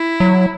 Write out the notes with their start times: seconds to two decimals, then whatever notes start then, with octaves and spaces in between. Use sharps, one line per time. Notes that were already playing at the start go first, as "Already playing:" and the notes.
Already playing: E4
0.20 F#3